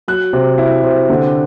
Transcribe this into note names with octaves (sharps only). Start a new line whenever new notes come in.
F#3 F#6
C3
E4
C3
D3